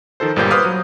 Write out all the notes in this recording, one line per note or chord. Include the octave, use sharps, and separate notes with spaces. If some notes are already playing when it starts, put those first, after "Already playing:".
D#3 F3 A4 C5
G1 A#2 G3 A#3 C5 G6
B4 C5 F5 D6 D#6 F6
F#3